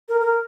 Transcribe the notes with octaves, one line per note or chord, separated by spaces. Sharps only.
A#4
A#4